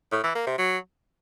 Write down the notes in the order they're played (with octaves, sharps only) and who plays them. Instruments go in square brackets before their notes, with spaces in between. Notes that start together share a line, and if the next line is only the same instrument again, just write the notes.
[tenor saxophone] A2
E3
A#3
C3
F#3